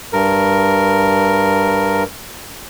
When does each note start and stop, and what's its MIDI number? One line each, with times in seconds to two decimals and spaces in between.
0.13 2.03 43
0.13 2.03 70